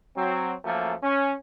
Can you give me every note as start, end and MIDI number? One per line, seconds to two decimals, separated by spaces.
0.16 0.53 54
0.16 0.53 60
0.65 0.92 42
0.65 0.92 53
0.65 0.92 57
0.65 0.92 58
1.02 1.33 61